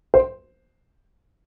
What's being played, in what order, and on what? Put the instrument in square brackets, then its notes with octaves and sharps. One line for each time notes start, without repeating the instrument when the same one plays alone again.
[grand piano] C5